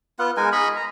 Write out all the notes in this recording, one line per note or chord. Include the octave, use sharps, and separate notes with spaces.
B3 F4 F#5
G#3 D#4 A#4 G#5
G#4 D#5 B5 C#6
A#5